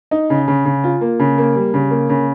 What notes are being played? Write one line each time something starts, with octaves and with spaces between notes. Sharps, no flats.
D#4
C#3
C#3
C#3
F4
A#3
C#3
A#3
G3
C#3
A#3
C#3